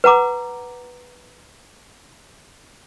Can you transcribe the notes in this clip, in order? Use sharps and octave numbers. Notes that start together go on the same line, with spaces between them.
B4 F#5 A#5 D6